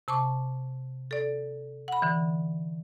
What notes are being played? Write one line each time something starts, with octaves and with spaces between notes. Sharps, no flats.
C3 A5 C#6 D6
A4 D5
F#5 B5
D3 E3